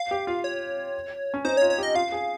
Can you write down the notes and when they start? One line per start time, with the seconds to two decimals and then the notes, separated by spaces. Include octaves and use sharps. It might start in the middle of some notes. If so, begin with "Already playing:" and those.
Already playing: F5
0.11 G4
0.27 F4
0.44 C#5
1.34 C#4
1.45 D#4 C5
1.57 C#5
1.62 F4
1.70 C#5
1.78 G4
1.83 D#5
1.95 F4 F5
2.12 G#4